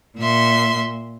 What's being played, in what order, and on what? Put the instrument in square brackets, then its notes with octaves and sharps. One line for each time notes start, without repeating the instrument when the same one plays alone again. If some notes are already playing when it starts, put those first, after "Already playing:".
[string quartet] A#2 E5 C6